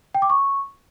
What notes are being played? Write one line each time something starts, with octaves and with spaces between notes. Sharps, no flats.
G5
D6
C#6